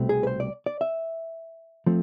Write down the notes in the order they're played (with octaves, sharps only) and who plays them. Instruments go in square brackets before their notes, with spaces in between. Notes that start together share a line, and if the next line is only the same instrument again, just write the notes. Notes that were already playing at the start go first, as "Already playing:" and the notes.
Already playing: [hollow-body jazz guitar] C2 B2 A3 C4
G#4
B4
C5
D5
D5
E5
F3 A3 C4